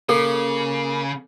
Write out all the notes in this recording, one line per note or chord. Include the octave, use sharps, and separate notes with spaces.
C#3 A#3 A4